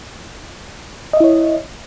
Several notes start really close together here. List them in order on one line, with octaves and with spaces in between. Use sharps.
D#5 E5 E4 C#5